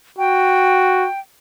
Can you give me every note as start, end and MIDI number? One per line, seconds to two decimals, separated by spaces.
0.18 1.07 66
0.18 1.20 79